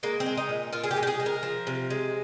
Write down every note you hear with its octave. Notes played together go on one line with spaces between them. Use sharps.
G#3 A#3
C4
G#3
D#4
A#2
A#2 F4
G#4
G4
G#3
G4
G#4
G#3
A#4
F3
C3
G#3